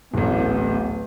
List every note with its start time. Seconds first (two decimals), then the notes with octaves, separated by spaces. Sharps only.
0.14 D1 A1 B3